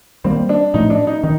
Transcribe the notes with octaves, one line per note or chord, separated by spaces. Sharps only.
D#3 G3 A#3 C4
D4
A2 F3 A3 D#4
D4
D#4
D#3 D#4